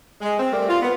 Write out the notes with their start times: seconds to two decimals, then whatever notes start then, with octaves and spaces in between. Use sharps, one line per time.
0.21 G#3
0.39 C4
0.52 G3 A3 C4 A#4 D5
0.69 F4
0.83 B3